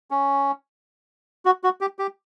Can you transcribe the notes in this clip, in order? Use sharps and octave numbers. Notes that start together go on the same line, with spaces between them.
C#4
F#4
F#4
G4
G4